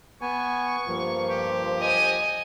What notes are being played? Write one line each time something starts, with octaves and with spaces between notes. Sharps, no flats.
B3 G#5 C#6
G2 F3 A#3
G4
D#5 G#5